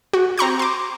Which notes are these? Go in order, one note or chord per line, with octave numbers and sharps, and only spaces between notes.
F#4
C4 A#5 C#6 G6
C6 D6